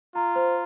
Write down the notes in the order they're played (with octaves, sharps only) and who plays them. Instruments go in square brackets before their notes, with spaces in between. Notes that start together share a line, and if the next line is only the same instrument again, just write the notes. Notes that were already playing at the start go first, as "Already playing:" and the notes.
[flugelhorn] F4 [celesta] A#5
[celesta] C5